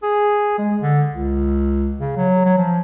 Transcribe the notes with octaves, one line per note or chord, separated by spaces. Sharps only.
G#4
G#3
D3
C#2
C#3
F#3
F#3
F3